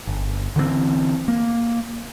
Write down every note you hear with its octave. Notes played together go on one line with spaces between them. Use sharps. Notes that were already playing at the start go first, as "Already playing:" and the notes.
G1
D3 E3 G3 C4
A#3